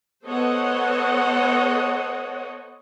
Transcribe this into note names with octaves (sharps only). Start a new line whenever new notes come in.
B3 A4 C5 C#5 D#5 F#5